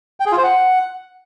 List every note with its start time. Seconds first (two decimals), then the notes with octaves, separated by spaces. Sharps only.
0.20 G5
0.26 G#4
0.32 F4
0.38 C5
0.44 F#5